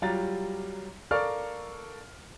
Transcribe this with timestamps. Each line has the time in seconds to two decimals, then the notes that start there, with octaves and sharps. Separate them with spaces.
0.02 F#3 G3 F4 G4 A#5 A6
1.11 A4 A#4 D5 F5 C#6 F6